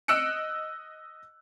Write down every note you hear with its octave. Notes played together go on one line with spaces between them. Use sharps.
D#5 E6 F#6 C#7 D7